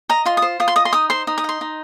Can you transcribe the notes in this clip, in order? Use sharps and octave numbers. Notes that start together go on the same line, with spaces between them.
D#5 A#5
F4 C6
D#6
C5
F4 D#6
C6
D#5 D#6
C6
D#4 D#6
C5 C6
D#4 D#6
D#6
D#5 C6
D#4